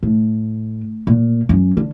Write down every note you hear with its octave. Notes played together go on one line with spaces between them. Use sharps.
A2
A#2
F#2
D3